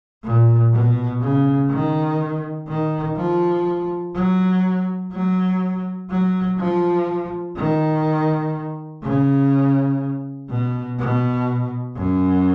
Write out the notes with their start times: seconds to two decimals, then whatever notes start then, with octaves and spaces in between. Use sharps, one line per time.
0.24 A#2
0.73 B2
1.22 C#3
1.70 D#3
2.68 D#3
3.17 F3
4.15 F#3
5.12 F#3
6.10 F#3
6.59 F3
7.56 D#3
9.03 C#3
10.49 B2
10.99 B2
11.96 F#2